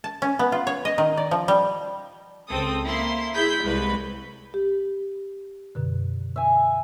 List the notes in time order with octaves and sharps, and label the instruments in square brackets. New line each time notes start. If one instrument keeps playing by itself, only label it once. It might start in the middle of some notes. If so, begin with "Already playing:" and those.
[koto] A5
C#4
B3
F4
C#5
D#5
D#3
D5
F3
G3
[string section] C#2 C4 A4 D#6
A#3 E4 C6
E4 G#4 B5 G6 B6
C2 G#3 B4 B5
[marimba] G4
F#2 B2 D3
[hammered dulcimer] E5 G#5